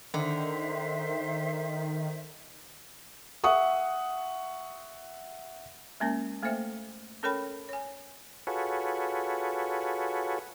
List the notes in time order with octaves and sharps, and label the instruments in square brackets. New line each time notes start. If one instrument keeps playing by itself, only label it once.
[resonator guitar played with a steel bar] D3 [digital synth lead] D#3 [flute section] C5 E5
[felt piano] E5 F#5 C#6 D#6
[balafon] G#3 A#3 C#4 A#4
A3 A#3 A4 C5 E5 G5
C#4 A4 A#4 C#5 G5 B5
C#5 G#5
[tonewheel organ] F4 F#4 G#4 A4 B4 C#5